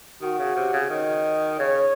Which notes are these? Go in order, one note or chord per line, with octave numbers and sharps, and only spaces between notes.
D#3 F#4
C#3
C3
C#3
D#3 D#5
C#3 C#5